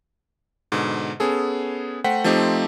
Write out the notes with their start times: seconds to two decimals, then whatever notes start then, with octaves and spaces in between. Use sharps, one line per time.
0.72 G#2 B2 D3
1.20 B3 C#4 G#4 A4
2.04 A3 C5 F#5 G5 B6
2.24 F3 A3 C4 D#4 G4